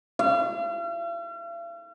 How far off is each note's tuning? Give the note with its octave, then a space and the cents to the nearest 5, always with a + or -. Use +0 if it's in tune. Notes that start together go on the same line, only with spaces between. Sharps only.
F5 -45